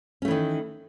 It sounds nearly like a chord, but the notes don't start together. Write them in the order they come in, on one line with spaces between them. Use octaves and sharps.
C#4 A3 E3 D#3